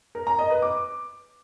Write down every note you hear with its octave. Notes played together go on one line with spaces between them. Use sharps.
A#4
A#5
D#5
B4
D6